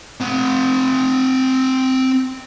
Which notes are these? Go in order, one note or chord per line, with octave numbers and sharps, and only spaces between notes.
C4 F#5